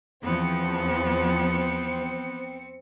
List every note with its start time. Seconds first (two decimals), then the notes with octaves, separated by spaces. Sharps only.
0.24 E2 F3 B3 C4 C#7